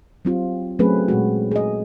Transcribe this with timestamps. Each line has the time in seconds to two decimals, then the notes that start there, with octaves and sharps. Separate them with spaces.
0.25 F#3 C4 F4 G4
0.79 F#3 A3 C4 C#4 G#4 B4
1.08 A#2 G#3 F#4
1.52 G#4 D#5